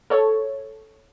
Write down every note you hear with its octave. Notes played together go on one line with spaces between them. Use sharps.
A4 C#5